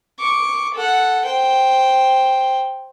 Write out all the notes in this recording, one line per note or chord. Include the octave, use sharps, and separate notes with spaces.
C#6 D6
A4 F#5
C5 G5